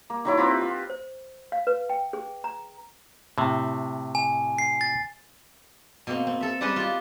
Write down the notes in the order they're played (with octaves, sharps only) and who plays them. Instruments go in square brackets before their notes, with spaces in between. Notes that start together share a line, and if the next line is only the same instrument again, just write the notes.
[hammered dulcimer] A#3
D#3 F#3 E4
C4 F4 G4 B4
F4
[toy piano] C5
F5
B4
G5
G#4
A#5
[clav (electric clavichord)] A2 C3
[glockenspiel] G#5
C7
A6
[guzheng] B2 A#3 C4
C4
A4 E5
G3 G#3 G4 A4 B4 D#5
F4 G4